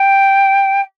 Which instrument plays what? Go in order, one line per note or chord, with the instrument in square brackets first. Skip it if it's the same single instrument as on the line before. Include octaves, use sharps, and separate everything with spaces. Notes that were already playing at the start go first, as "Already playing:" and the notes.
Already playing: [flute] G5